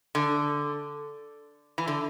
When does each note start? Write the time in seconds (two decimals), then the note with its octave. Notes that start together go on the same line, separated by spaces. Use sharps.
0.15 D3
1.78 E3
1.88 D3